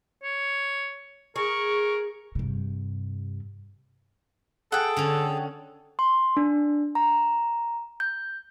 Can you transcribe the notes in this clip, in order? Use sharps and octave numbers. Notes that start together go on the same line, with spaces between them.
C#5
G#4 A#4 C#6
G2 C3
G#4 A4 F#5 G5
D3 C#4
C6
D4
A#5
G6